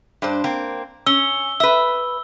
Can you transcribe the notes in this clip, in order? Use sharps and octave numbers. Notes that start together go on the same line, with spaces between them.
G2 D4 C5
A#3 C4
C#4 E6 G7
B4 E5 E6